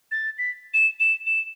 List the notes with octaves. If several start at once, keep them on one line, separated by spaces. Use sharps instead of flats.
A6
B6
E7
E7
E7